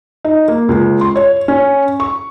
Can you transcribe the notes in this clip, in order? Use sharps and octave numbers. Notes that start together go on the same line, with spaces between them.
D#4
A#3
C#2
C6
C#5
C#4
C#6